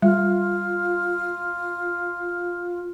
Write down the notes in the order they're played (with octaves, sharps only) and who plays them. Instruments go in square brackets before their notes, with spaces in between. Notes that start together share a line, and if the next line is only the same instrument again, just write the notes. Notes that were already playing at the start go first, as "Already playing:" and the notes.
[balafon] G3 [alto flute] F4